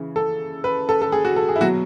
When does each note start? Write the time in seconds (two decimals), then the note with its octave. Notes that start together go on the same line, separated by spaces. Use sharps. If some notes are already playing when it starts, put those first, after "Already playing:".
Already playing: C#3 E3
0.16 A4
0.64 B4
0.89 A4
1.02 A4
1.12 G#4
1.25 F#4
1.36 A4
1.49 G#4
1.56 E4
1.61 B2 F#3 F#4